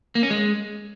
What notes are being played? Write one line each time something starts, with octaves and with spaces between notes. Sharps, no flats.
A#3
C#4
G#3